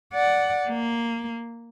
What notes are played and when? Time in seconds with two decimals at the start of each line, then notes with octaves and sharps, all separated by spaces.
0.14 D5 F#5
0.69 A#3